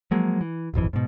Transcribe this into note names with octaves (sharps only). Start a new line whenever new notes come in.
F3 F#3 G#3 A#3
E3
D#1 G#1 F2 E3
G#2 B2